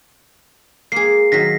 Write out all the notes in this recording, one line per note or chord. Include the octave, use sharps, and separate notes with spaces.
A#3 G#4 C7
D#3 F#3 A#6 B6